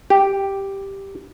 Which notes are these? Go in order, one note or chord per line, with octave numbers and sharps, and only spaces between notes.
G4